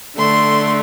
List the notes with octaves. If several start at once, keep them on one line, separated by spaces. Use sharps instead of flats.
D3 A3 C6